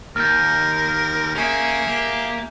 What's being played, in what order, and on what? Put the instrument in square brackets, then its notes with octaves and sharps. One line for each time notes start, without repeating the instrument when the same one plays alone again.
[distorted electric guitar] D#2 [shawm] A#4 [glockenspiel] F6 G6
[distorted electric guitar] A#3 [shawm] C#4 [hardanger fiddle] G#4 E5
[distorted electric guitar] A#3 [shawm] G4